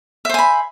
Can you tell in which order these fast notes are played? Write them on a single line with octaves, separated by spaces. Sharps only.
E5 C5 G#5 B5